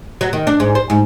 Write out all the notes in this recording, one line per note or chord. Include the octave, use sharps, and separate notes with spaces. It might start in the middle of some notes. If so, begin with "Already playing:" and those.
F#3
D#3
D4
G#2
C5
G#2